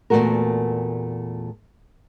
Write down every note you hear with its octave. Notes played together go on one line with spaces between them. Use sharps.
E2 A#2 D3 A3 F#4 A#4